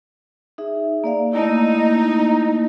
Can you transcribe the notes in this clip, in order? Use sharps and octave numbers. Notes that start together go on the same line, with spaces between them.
D#4 G#4 E5
A#3 D5 F5
A3 A#3 D#4 E4